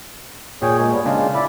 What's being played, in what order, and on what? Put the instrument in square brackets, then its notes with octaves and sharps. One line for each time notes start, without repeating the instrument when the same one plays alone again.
[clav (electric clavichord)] A#2 [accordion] G#4 C#5 G5
[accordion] G#3 A#3
G3 B3
[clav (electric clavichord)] C#3 D4 [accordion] G#3 F4
[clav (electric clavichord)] E4 [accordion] D5 B5